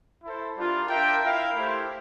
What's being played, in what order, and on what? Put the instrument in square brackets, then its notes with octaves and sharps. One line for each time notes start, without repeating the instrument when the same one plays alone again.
[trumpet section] E4 A4 C5
G3 D4 F4 A#4
D4 F4 A#4 E5 G5
E4 A#4 F5
A3 E4 G4 C5